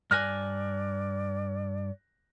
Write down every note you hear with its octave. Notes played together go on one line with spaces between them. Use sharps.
G2 D5 G#5 F6 F#6 A#6